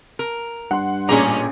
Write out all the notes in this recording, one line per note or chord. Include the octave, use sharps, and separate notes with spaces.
A#4
G2 F#5 C6
A1 A#2 C#4 D4 G#4 A#5 D6